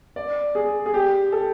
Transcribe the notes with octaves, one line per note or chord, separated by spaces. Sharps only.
D5
G#4
G#4
G4
A4